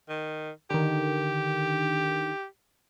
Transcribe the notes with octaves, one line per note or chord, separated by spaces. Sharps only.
D#3
D3 D#3 G4